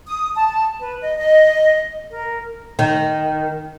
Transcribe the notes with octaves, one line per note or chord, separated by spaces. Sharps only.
D#6
A5
B4
D#5
D#5
A#4
D#3